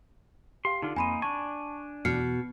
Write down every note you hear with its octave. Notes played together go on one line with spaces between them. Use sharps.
G4 F5 C6
D3 D#4 F4
F2 A#3 C4 D#4 G#5 B5 C6 D#7
D4 G#5 A5 C#6
E2 B2 E3 F6 C7 C#7